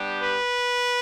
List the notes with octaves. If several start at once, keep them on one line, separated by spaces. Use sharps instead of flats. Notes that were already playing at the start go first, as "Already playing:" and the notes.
Already playing: G3 B3 D4 G4
B4